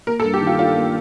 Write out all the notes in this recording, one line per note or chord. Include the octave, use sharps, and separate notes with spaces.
A#3 A#4
A4
G2
G4
D#3
F4
D4 F4
A#3